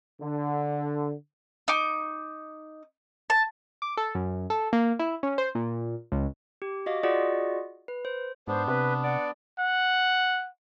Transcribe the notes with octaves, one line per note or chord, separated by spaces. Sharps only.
D3
D#4 D6
A5
D6
A4
F#2
A4
A#3
E4
C#4
C5
A#2
C#2
G4
F#4 D#5 F5 D6
F4 F#4 G#4 D5 D#5 F#5
B4
C5
G#2 B3 D4 C5
C3 B4
D5 F#5
F#5